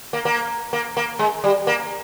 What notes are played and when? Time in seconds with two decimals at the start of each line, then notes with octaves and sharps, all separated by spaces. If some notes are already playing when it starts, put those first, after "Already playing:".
0.13 A#3
0.25 A#3
0.73 A#3
0.97 A#3
1.19 G#3
1.44 G3
1.67 A#3